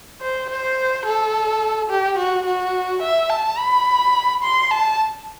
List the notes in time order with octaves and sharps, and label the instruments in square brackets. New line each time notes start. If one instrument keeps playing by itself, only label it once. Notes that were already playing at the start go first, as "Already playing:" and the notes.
[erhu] C5
C5
A4
G4
F#4
F#4
E5
A5
B5
C6
A5